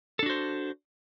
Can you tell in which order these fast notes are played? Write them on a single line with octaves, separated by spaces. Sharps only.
A4 D4 F#4 C5